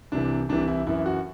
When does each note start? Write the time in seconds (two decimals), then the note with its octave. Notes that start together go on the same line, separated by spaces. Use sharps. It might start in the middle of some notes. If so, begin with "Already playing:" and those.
0.12 C2 C3 E3 D4
0.49 C2 C3 E3 D4
0.68 E4
0.87 F#2 E3 E4
1.06 F#4